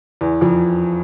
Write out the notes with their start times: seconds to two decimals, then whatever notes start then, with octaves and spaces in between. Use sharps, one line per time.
0.21 E2 E3
0.41 F2 F3